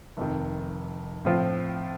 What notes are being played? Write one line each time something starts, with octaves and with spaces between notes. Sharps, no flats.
F1 F2 D#3
A2 F3 C4 F4 C5